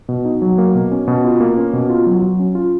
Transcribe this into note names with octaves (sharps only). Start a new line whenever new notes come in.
B2
D#4
F#3
A#3
B2
C#4
B2
F4
A#3
C#4
B2
F4
F#3
F#3
C#4
F4